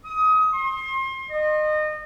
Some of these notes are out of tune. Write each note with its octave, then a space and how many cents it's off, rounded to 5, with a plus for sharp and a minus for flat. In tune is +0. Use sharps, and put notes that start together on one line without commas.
D#6 +25
C6 +35
D#5 -30